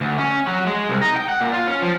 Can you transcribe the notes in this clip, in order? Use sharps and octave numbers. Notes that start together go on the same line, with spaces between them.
D2
C#4
F#3
G#3
C2
D#4
G5
F#5
A#2
F4
C#4
F3